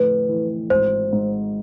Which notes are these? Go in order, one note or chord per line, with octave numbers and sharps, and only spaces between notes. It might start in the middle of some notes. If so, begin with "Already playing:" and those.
Already playing: F2 A2 D3 B4
E3
G#1 C5
G#2